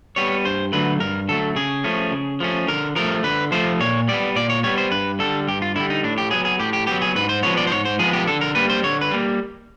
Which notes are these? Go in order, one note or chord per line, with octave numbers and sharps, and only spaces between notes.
G3 B3 C#5
G2 C5
D3 F#3 A3 B4
G2 A#4
D3 F#3 A3 A4
C#3 G#4
F3 A3 C#4
C#3
F3 A3 C#4
D3 A#4
F3 A3 A#4
D3 B4
F3 A3 C5
A#2 C#5
G3 B3 D5
A#2 D5
C#5
G3 B3 C#5
C5
G2 B4
D3 G3 A4
G2 G4
F4
D3 G3 E4
D#4
A2 D4
G4
F#3 B3 G#4
G#4
A2 G4
G4
F#3 B3 G4
G#4
G#2 B4
C5
F3 G#3 B3 C#5
D5
C5
G#2 C#5
C5
F3 G#3 B3 G#4
G4
D3 A4
A#4
G3 A#3 B4
C5
D3 C#5
B4
G3 A#3